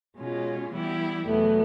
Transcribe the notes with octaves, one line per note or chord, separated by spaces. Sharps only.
B2 G#3 C#4 F4
E3 G3 B3 E4 G4
E2 B2 F#3 A3 B3